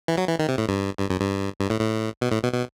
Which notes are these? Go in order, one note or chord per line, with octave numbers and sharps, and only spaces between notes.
E3
F#3
E3
D#3
C3
A2
G2
G2
F#2
G2
G2
A2
A2
B2
A2
B2
B2